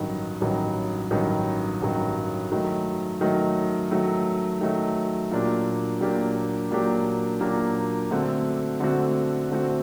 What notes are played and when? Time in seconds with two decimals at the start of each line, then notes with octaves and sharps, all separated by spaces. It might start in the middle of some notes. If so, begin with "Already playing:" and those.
Already playing: A1 G2 D#3 F#3
0.41 A1 G2 D#3 F#3
1.11 A1 G2 D#3 F#3
1.81 A1 G2 D#3 F#3
2.51 D#3 F#3 A3
3.21 D#3 F#3 A3
3.91 D#3 F#3 A3
4.61 D#3 F#3 A3
5.31 A#2 F#3 A#3 D4 G4
6.01 A#2 F#3 A#3 D4 G4
6.71 A#2 F#3 A#3 D4 G4
7.41 A#2 F#3 A#3 D4 G4
8.11 D3 A3 C4 F#4
8.80 D3 A3 C4 F#4
9.51 D3 A3 C4 F#4